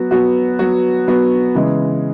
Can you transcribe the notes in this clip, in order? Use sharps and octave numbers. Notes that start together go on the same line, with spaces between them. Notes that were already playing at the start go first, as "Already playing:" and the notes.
Already playing: F#3 B3 F#4
F#3 B3 F#4
F#3 B3 F#4
F#3 B3 F#4
C#3 E3 G#3